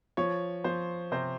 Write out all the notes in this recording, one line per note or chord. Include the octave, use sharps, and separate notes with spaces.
F3 C#5
F3 C5
C3 C5